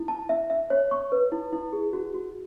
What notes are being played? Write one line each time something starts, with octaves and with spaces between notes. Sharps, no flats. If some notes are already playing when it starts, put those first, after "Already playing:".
Already playing: E4
A5
E5
E5
C#5
C#6
B4
E4
E4
G#4
F#4
F#4